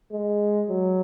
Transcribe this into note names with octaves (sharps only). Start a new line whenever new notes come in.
G#3
F#3